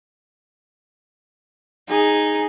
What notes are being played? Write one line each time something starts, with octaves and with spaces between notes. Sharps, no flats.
D#4 G#4